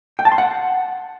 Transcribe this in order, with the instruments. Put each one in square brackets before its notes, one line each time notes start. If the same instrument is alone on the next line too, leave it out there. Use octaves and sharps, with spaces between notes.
[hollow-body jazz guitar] G5
A5
C6
F#5